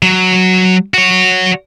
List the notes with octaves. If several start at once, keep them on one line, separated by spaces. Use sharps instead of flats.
F#3
F#4 C#5